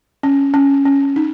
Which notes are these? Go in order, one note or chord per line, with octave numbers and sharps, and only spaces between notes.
C#4
C#4
C#4
D#4